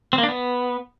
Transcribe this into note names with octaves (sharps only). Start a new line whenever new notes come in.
C4
A#3
D4
B3